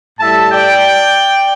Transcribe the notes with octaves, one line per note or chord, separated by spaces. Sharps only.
A2 G3 E5 A5
D5 G5